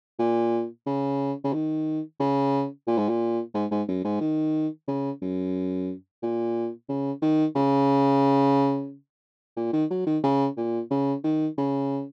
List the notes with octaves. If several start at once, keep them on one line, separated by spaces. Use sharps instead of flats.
A#2
C#3
C#3
D#3
C#3
A#2
G#2
A#2
G#2
G#2
F#2
G#2
D#3
C#3
F#2
A#2
C#3
D#3
C#3
A#2
D#3
F#3
D#3
C#3
A#2
C#3
D#3
C#3